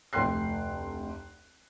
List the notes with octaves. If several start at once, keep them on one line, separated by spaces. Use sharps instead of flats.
F1 D2 G5 C6 F#6 C7